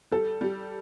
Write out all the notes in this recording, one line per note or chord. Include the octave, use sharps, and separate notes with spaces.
G3 A4
G3